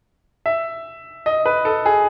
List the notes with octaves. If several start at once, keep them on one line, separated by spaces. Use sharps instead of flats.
E5
D#5
B4
A4
G#4